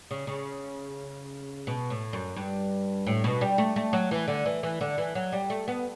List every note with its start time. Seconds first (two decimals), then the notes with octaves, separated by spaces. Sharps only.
0.11 C#3
0.27 C#3
1.67 B2
1.90 A2
2.13 F#2
2.36 G2
3.07 A2
3.24 B2
3.41 G3
3.58 A3
3.76 A3
3.93 F#3
4.11 E3
4.28 D3
4.46 E3
4.63 E3
4.81 D3
4.98 E3
5.15 F#3
5.32 G3
5.50 A3
5.68 B3